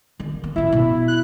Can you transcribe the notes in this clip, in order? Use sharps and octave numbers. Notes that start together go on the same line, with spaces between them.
D#3
A#3
A1 F#2 E4
B2
F#6